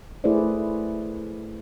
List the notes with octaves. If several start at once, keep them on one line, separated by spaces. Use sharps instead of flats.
A3 E4 G#4 B4 C5 D5